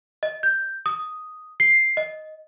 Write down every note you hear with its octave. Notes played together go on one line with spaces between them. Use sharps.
D#5
G6
D#6
C7
D#5